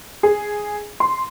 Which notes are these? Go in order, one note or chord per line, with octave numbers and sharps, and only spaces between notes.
G#4
C6